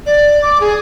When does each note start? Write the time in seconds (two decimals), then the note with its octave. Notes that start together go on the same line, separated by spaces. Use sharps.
0.05 D5
0.42 D6
0.60 G#4